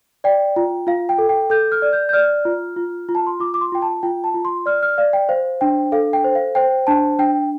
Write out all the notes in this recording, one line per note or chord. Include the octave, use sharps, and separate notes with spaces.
D5 G5
F4
F4 F5
G5
A4
G5
A4 G6
F6
D5
G6
G6
D5 F6
F4
F4
F4
A5
C6
F4 D6
D6
C6
F4 G5
A5
F4 G5
A5
F4
C6
D5 F6
F6
D5 F5
G5
C5 F5
D4 G5
A4 F5
G5
C5
F5
C5 G5
D4 A5
D4 G5